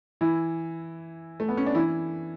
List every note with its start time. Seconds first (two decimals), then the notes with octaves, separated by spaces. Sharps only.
0.21 E3 E4
1.40 A3
1.49 B3
1.57 C#4
1.66 D4
1.75 E3 E4